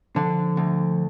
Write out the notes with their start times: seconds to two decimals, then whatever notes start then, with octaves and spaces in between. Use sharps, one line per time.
0.15 D3 F3
0.57 D2